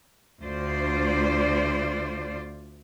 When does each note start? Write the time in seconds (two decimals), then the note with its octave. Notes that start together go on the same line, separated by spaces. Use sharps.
0.42 D2 F4 C5 D5